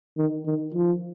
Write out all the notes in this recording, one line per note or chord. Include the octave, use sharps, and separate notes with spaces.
D#3
D#3
F3